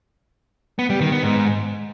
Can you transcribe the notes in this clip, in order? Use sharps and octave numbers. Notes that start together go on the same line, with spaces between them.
B3
G3
D#3
B3
G#2